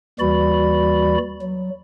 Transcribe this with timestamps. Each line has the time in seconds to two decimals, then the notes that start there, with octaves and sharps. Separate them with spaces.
0.19 D#2 E3 G3 F#4 D5 B5
1.41 F#3